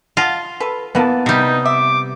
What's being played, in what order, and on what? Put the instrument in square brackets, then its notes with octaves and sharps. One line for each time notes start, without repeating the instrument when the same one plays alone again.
[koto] F4 [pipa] D#5 F#5 A5
[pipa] A4 B4
[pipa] E3 A#3 E4 [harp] B3 A5
[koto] C3 G3 [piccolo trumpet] D#4
[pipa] E5 [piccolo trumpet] D6